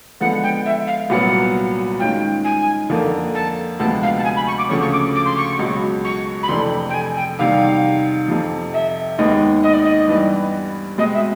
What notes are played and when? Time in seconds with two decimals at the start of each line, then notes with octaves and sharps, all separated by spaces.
0.21 D3 F3 G#3 B3 F#5
0.43 G5
0.65 E5
0.87 F5
1.10 C2 A#2 F#3 B3 F#5
1.99 D#3 G#3 C#4 F4 G5
2.44 G#5
2.90 F2 D3 F3 A#3
3.34 A5
3.79 D2 C3 F3 G#3 B3 A5
4.02 F5
4.18 A5
4.24 G#5
4.36 B5
4.47 C#6
4.58 D6
4.69 D2 C#3 F3 A3 C#4 C#6
4.80 C#6
4.92 D6
5.15 D6
5.25 C6
5.36 C#6
5.59 C#2 B2 F#3
6.04 C#6
6.42 B5
6.48 F2 C3 E3 A3 D4 C6
6.89 G5
6.93 G#5
7.16 G5
7.38 E2 C3 D#3 G3 F5
8.28 F2 C3 F3
8.73 E5
9.18 D#2 D#3 G#3 B3 D#5
9.63 D#5
9.73 D5
9.83 D#5
10.08 G2 E3 G3 B3
10.98 B2 G#3 C4 D#5
11.14 E5